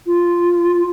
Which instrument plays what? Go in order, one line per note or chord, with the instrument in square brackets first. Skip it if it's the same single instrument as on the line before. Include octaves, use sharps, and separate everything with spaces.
[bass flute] F4